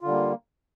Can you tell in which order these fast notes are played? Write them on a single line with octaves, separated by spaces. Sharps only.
F4 D3 G3 A#3